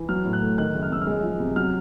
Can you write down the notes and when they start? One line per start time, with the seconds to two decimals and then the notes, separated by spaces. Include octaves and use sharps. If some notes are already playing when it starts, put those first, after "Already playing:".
Already playing: E3
0.09 F#3 F6
0.25 A2
0.33 F#6
0.42 A3
0.58 D#3 F#6
0.74 F#1
0.83 F6
0.91 F#2 E6
1.02 F6
1.07 G#3
1.23 F3
1.40 C3
1.56 F#3 F6